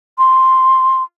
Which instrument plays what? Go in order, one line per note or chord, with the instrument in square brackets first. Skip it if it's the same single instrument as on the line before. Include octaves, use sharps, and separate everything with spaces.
[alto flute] C6